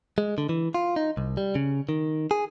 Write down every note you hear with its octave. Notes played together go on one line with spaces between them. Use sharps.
G#3
D3
E3
F4
D#4
C2
G3
C#3
D#3
G#4